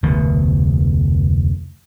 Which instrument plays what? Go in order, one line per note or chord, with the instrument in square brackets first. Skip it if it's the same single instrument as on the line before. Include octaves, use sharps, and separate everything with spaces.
[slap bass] F1 D2 B2